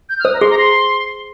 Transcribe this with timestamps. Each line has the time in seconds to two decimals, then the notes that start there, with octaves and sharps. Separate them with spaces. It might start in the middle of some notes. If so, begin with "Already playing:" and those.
0.09 G6
0.19 F6
0.25 C5 D#6
0.34 A#5
0.41 G#4 C6
0.50 A#5
0.58 C6